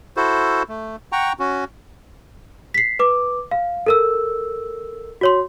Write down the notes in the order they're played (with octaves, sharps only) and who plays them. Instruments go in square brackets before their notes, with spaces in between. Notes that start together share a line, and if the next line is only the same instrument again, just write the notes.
[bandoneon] E4 F#4 A4 C5
A3
F#5 G5 A#5 C#6
C#4 F#4
[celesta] B6 C7
B4 D6
F5
A4 A#4 E6
F#4 C#5 C6